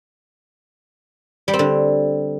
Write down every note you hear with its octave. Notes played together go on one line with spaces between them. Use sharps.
G3
C4
D3